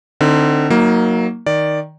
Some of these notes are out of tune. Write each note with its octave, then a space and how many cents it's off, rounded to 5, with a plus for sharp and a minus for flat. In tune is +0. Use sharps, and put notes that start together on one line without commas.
D3 +25 C4 -5 D#4 +35
F#3 +0 A#3 +0 D#4 +35
D#3 +0 D5 +0